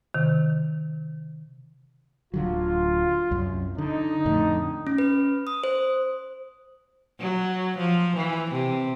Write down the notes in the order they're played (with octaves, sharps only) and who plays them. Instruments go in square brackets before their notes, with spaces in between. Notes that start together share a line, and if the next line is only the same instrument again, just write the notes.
[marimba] C3 D#3
[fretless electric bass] D1 D3 F#3 [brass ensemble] F4
[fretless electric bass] C2 F#2
[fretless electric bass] D3 [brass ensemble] D#4
[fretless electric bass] F2 A2 D3
[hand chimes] C#4
B4
D#6
C5
[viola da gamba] F#3
F3
E3
C3